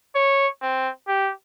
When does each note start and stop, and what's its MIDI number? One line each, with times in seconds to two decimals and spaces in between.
0.15 0.47 73
0.62 0.90 60
1.08 1.31 67